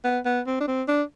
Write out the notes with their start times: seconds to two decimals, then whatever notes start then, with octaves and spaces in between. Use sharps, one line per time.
0.04 B3
0.26 B3
0.47 C4
0.60 D4
0.68 C4
0.88 D4